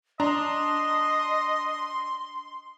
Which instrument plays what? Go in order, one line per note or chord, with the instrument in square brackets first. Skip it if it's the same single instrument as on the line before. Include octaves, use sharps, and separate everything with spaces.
[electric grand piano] D4 A#5 [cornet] D#5 [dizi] C6